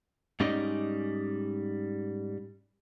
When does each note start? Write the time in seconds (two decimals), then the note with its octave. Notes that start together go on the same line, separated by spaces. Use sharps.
0.40 G#2 G3 C#4 D#4 D5 D#5